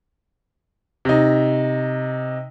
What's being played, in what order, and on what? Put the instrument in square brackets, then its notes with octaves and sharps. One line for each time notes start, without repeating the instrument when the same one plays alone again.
[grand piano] C3 D#4